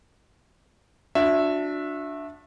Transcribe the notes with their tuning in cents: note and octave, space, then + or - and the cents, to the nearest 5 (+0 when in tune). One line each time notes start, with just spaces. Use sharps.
D4 +0 F#4 -35 E5 +0